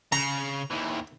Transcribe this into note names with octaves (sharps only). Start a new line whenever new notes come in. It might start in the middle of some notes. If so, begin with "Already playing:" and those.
C#3 A#5
D#2 E3